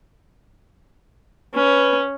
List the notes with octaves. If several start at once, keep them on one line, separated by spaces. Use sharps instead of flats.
C#4 B4